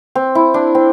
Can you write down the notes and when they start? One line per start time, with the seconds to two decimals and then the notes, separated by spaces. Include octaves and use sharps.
0.15 C4
0.35 E4
0.54 D4
0.75 C4